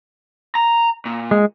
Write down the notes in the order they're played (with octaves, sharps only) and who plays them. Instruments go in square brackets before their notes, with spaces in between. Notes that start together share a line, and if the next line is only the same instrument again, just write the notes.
[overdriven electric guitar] A#5
A#2
[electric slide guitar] G#3